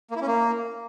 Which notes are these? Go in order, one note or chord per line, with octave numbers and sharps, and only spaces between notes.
A#3
E4
C#4
A#3